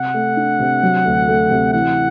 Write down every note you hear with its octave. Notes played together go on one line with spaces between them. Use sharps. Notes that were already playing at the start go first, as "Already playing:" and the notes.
Already playing: C3 F#5
A3
D4
C3
F#3
D2
A3
C3
E3 F#5